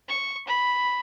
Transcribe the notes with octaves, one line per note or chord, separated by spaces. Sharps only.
C#6
B5